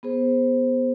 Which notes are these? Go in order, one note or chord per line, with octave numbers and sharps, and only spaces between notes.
B3 G#4 C5